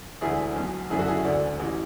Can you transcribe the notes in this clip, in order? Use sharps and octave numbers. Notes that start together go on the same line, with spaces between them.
E1 D2 D3 E4 G#4
B1 B2
F#1 F#2 D3 E4 G#4
F#4 A4
E4 G#4
E1 D2 D3 D4
A1 E3